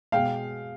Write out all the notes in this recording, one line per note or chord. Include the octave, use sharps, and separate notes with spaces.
B2 G#3 F5 G5